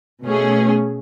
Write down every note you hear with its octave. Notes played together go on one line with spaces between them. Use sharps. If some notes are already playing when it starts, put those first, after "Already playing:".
B2 A3 C#4 G#4